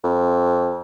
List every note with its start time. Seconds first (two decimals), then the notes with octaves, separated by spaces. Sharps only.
0.04 F2